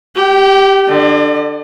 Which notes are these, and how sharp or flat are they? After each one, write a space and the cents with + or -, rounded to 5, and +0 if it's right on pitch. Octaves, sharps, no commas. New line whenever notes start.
G4 +0 G5 -30
D3 +15 D5 +45